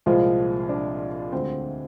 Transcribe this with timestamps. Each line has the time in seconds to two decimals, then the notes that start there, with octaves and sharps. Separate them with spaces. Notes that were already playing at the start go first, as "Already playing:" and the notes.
0.06 C2 A#2 F3 G#3 C4 F4
0.69 D4
1.32 D2 D3 G#3 C4